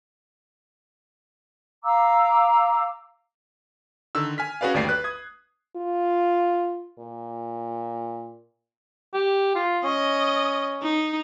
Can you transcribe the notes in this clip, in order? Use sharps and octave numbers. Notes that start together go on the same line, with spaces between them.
F5 A#5 D6 E6
D3 D#3 E6
G#5 F6 B6
C#4 F#4 G#4 B4 D5 F5
G1 D#2 A3 D5 G5 C7
B4 F#6
D#6 G#6
F4
A#2
G4
F4
C#4 D#5
D#4